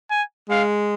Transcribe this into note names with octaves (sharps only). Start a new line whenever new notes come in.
G#5
G#3 F5